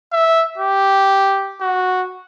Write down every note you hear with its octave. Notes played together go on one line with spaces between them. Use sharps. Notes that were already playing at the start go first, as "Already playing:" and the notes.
E5
G4
F#4